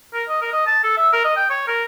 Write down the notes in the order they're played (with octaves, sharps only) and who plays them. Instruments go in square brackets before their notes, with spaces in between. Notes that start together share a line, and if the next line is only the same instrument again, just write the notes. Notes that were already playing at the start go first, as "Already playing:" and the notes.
[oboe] A#4
D#5
A#4
D#5
A5
A4
E5
A#4
D#5
G5
C#5
A#4